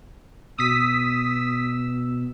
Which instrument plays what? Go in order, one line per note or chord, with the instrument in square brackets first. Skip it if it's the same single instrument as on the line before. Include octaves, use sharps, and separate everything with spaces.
[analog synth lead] B2 [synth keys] D#6 B6 [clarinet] E6